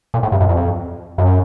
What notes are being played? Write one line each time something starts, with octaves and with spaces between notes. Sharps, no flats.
A#2
A2
G2
F#2
F2
F#2